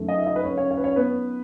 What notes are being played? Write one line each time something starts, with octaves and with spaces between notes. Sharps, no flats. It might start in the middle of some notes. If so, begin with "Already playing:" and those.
Already playing: F#2 D#3 A3
D#4 D#5
E5
D#4 D#5
B4
C#4 C#5
C#4 C#5
C#4 C#5
B4
C#4 C#5
B3 B4